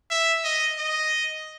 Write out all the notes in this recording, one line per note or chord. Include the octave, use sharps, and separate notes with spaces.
E5
D#5
D#5